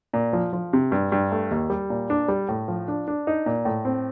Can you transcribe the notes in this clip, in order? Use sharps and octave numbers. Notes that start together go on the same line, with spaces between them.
A#2
F3
F3
C3
G2
G2
A3
D#2
G3
A#2
D4
G3
A2
F3
D4
D4
D#4
A#2
A2
C4